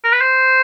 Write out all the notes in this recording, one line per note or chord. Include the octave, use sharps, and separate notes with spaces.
A#4
B4
C5